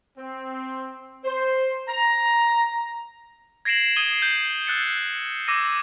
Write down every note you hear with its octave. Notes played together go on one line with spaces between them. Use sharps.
C4
C5
A#5
G#6 A#6 C7 D7 E7 F#7
D#6 G#6 A#6 D#7 G7
G6
E6 F#6 A6 C#7
D6 E6 G#6 A#6 D#7